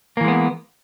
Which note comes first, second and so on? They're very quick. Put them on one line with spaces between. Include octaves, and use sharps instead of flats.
A#3 E3 G#3 B3